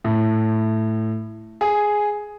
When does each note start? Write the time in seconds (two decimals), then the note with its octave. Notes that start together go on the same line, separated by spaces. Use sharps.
0.04 A2
1.61 G#4